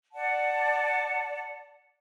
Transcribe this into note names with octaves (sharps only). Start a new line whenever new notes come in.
D5 F#5 A5